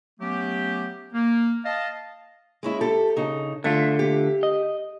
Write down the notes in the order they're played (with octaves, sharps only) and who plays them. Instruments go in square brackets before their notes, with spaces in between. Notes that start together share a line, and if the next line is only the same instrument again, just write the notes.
[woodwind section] F#3 A3 B3 C#4 G4
A#3
D#5 F5 A5
[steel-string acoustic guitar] G#3 C#4 E4
G4 A4
C#3 D#4
[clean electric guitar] D3 A3 F4 [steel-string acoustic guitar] E5
[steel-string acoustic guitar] G4
[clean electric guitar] D#5